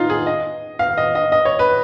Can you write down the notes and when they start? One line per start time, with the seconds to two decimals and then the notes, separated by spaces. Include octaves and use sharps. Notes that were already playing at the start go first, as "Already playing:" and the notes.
Already playing: D#4 F4
0.10 G#4
0.27 D#5
0.79 F5
0.97 D#5
1.15 D#5
1.32 D#5
1.45 C#5
1.59 B4